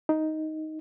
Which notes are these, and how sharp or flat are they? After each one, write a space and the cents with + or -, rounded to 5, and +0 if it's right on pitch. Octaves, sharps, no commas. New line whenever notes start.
D#4 +5